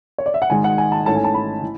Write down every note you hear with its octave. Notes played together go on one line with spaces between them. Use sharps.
C#5
D5
E5
F#5
G#1 G#2 G#3 G#5
F#5
G#5
A5
G#2 E3 A3 C#4 A5
G#5
A5
B5
E3